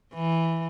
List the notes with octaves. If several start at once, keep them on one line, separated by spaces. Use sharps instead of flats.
E3